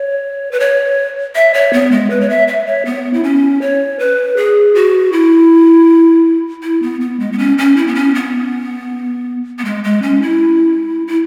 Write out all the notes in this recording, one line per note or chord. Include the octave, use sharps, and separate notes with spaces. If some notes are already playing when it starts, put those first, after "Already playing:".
Already playing: C#5
B4
C#5
E5
C#5
B3
G#3
B4
C#5
E5
E5
C#5
B3
E4
C#4
C#5
B4
G#4
F#4
E4
E4
B3
B3
G#3
B3
C#4
C#4
E4
B3
C#4
B3
B3
G#3
G#3
C#4
E4
E4